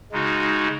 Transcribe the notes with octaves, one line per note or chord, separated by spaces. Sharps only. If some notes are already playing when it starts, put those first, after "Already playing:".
C#3 G#3 D#4 F#4